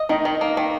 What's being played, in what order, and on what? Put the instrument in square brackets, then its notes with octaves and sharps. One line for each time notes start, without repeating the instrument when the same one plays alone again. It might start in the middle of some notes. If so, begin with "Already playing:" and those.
Already playing: [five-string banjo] D#5
[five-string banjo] D#3 [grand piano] D#4
[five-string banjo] D#3
A#3
D#3